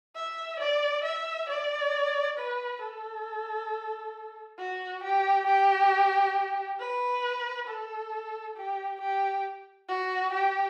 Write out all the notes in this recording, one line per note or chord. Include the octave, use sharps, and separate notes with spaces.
E5
D5
E5
D5
B4
A4
F#4
G4
G4
B4
A4
G4
G4
F#4
G4